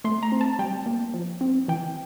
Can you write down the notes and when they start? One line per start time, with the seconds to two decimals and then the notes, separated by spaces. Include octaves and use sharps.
0.04 A3 C6
0.23 A#5
0.32 C4
0.41 A5
0.59 G3 G5
0.86 A#3
1.14 F3
1.41 C4
1.68 E3 G5